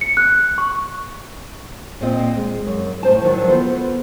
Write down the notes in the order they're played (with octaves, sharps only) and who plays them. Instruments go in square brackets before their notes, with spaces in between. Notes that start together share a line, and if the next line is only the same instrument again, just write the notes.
[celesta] C#7
F#6
C#6
[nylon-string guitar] A#2 C4 F4 D#5
G#3
F#2
A2 D#4 C5 A5
D#3 F3 F#3 D4 E4
B3 F4 A4 B4 C5